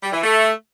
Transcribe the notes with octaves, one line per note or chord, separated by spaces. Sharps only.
G3
E3
A3